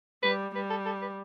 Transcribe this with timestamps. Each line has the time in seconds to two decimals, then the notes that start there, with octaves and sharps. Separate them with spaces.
0.23 G3 B4
0.55 G3 B4
0.70 A4
0.86 A4
1.01 B4